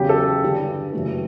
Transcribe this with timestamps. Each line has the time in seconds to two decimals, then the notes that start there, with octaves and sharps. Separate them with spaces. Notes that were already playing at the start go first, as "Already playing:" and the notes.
Already playing: E2 C#3 F#3 C#4 G4
0.09 A4
0.43 G2 D3 G3 D4
0.93 F#1 F#2 E3 A3